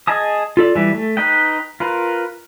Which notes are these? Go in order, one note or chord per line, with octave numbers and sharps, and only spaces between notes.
G#4 D#5 G#5 A5 D#6
F4 A4 D5
E3 G3
A3
D#4 B4 D#5 G5
F4 A#4 B4